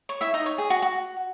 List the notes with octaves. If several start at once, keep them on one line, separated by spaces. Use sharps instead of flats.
C#5
E4 E5
D#4 D#5
C#5
G#4
F#4
F#4